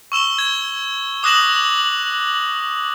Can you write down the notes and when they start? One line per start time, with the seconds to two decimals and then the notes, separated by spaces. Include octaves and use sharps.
0.12 C#6 E6 E7 G7
0.38 G#6 G7
1.23 D6 D#6 F#6 A#6 E7 F#7